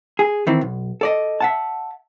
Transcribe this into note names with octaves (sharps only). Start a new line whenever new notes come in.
G#4
D#3 E3 C4
B1
A4 D5 D#5
E5 F#5 A5